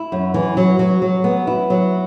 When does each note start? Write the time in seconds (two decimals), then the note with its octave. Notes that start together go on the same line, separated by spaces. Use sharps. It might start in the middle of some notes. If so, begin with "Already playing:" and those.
Already playing: E4
0.12 F#2
0.34 E3
0.57 F#3
0.79 F#3
1.02 F#3
1.24 B3
1.47 E4
1.70 F#3